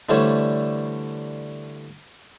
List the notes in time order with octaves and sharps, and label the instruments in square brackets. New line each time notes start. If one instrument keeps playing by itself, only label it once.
[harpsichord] D3 E3 G3 A3 C5 C#5